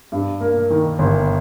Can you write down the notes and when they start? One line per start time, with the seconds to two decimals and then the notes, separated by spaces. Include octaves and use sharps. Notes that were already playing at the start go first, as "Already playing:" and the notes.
0.12 G2
0.41 A#3
0.70 D#3
0.99 G1